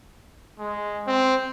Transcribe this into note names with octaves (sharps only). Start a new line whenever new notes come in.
G#3
C4